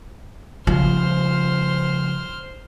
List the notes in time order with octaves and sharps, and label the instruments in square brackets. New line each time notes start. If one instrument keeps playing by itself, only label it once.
[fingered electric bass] C#3 F3 G3 [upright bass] F4 [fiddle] C5 F6